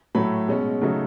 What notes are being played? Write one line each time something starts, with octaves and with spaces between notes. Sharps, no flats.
A2 F#3 A3 B5
B2 G#3 C#4
C#3 F#3 A3 D#4